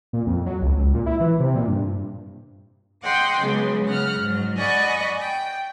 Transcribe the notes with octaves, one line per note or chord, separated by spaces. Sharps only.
A#2
F2
F#3
C#2
C#2
A#2
E4
E3
C3
A#2
G2
D#5 F#5 G5 C6 D6
C#3 F#3 G#3 B3
C#3 F#5 F6
G#2 F#3
D5 D#5 F#5 G#5 B5 C#6
G5